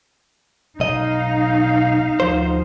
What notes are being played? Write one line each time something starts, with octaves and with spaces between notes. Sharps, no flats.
B1 D#4 D#5 F5
D2 F3 C5